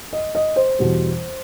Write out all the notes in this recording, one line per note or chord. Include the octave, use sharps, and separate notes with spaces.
D#5
D#5
C5
E2 B2 G3